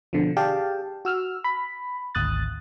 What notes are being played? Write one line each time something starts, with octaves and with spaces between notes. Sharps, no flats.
B2 D3 F3
G4 G#4 D5 F5 G5 A5
F#4 E6 F6
B5
G#1 D2 D#6 F#6 A6